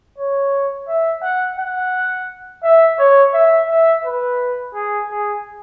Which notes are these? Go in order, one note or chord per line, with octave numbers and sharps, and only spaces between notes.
C#5
E5
F#5
F#5
E5
C#5
E5
E5
B4
G#4
G#4